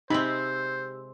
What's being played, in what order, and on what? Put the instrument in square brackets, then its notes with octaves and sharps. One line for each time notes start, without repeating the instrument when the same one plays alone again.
[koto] C3 G#3 C4 [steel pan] D#4 B5 [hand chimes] G4 E6 [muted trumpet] C5